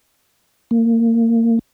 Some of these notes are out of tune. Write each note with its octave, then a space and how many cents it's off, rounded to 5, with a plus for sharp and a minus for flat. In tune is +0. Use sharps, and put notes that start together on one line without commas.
A#3 -25